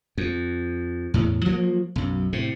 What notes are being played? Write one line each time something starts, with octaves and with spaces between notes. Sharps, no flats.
F2
E2 A2
F3 F#3 A#3
B1 F#2
A2 C3